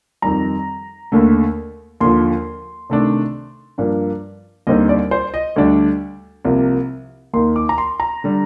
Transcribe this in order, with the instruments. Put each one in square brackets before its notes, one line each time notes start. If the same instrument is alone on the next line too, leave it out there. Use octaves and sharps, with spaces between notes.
[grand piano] F2 D#3 G3 A#5
D#2 D3 A3
D#2 D3 F3 C6
C3 D#3 A3 D4
G2 F3 A#3 D4
D#2 D3 G3 C4 D#4 D#5
D5
C5
D#5
D2 D3 G3 D4
C2 C3 F3 A#3
D#2 D#3 A#3 D#4 C6
D6
A#5
C6
A#5
D3 G3